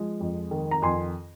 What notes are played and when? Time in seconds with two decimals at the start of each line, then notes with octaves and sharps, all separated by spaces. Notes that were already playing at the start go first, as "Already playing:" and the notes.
Already playing: F3 G#3
0.20 F2
0.51 D#3
0.71 A#5
0.82 F2 G#5 C6